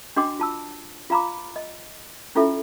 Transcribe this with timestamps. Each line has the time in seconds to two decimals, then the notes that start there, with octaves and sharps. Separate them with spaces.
0.16 D4 F#4 D#5 G5 C6 D6
0.39 F4 A5 E6
1.10 F4 F5 A#5 B5 D6
1.56 D#5
2.35 C#4 E4 F4 A4 E5